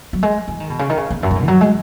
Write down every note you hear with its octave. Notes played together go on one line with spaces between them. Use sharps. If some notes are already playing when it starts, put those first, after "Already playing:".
F#3
G#3
E3
D#3
B2
C#3
D#3
C#3
E2
F#2
A2
G#2
E3
F#3
G#3